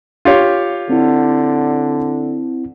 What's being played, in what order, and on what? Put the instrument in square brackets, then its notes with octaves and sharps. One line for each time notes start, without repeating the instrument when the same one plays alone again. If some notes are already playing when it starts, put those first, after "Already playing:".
[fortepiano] F4 G4 C#5
[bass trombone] D3 [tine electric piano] C4 E4